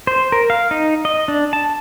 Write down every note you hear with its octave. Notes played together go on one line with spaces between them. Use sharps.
C5
A#4
F5
D#4
D#5
D4
A5